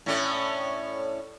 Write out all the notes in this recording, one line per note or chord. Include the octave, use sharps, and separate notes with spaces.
A2 C#4 D5